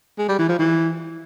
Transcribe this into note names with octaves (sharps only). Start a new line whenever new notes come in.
G#3
G3
E3
F3
E3